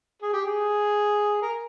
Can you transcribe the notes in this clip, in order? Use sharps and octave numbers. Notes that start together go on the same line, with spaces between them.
G#4
G4
G#4
A#4